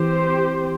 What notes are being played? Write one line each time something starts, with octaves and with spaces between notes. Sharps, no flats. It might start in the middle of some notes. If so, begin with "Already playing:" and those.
Already playing: E3 C4 G4 C5